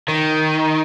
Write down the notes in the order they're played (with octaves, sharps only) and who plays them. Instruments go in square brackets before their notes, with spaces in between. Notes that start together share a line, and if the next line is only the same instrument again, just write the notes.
[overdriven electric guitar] D#3